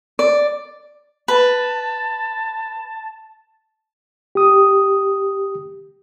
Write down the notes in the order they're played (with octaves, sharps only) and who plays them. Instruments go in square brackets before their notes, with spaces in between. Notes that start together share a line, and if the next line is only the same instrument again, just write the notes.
[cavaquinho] D5
[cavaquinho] B4 [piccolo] A5
[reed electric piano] G4 D#6